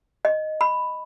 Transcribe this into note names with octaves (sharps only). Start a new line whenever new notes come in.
D#5
B5